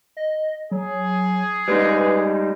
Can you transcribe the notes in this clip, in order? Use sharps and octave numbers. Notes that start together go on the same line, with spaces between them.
D#5
F#3 G#4
G3 G#3 D#4 B4